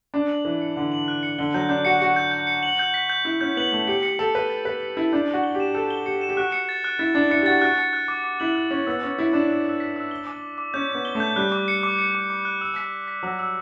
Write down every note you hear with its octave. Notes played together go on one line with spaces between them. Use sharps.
D4 F#6
F#7
E3 F#6
C#7
D3 F#7
F#7
F#6
C#7
D3 G7
F#3 G6
D4 G6
F#4 C#7
F#4 C#7
G6
G6
C#7
F#7
G6
B6
G6
E4 G6
C#4 G6
B3 F#7
A3 G6
G4 C#7
C#7
A4 C#7
B4 C#7
A6
B4 C#7
C#7
E4 A6
D4 G6
F#4 G7
G7
G4
E7
A4 G6
G7
G4 C#7
E7
G4
F#4 F#6
C#7
A6
F#6
E4 A6
D4 A6
E4 C#7
G4
F#4 A6
F#4 F#6
C#7
F#6
D6
D6
E4 F#7
F#6
C#4 D6
B3 E6
C#4 E6
E4 B6
D4 E7
E6
E6
B6
E6
G7
D6
D6
D6
C#4 G6
D6
B3
G7
A3
G6
G3 F#6
D6
C#7
D6
C#7
D6
D6
F#6
E6
B6
B6
B6
F#3 E6
E6